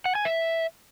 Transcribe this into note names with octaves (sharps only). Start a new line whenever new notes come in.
F#5
G#5
E5